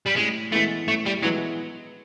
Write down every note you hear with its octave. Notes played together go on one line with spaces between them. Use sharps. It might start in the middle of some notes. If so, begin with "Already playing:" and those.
G3
A2 G#3
E3 G#3 A3 B3 E4
A2 A3
G3
E3 F#3 G#3 B3 E4